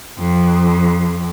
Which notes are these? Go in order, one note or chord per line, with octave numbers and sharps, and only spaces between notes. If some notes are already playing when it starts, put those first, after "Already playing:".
F2